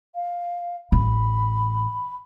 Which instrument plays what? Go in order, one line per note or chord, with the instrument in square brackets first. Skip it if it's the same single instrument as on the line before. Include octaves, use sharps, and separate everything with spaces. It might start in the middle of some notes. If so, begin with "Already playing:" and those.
[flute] F5
[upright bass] A1 [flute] B5